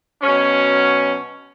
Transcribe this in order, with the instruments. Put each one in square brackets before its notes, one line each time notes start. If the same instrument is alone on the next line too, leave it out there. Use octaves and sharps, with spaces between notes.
[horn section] B2 F#3 C#4